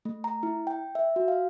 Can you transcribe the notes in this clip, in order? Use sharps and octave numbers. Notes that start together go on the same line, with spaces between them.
A3
A#5
E4
G5
E5
F#4
F5